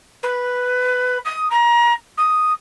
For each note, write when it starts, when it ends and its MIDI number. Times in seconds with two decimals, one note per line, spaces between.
0.22 1.17 71
1.25 1.47 87
1.50 1.92 82
2.17 2.52 87